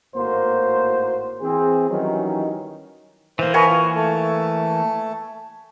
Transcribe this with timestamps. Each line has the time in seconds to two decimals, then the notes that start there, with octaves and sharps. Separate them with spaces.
0.15 G#1 A2 A#3 F#4 C5
1.41 E3 C4 G#4
1.90 D#3 E3 F#3 G3 C#4 D#4
3.39 E3 A#3 C5
3.54 A#4 B4 D#5 G#5 C#6
3.69 F4
3.96 A3 A4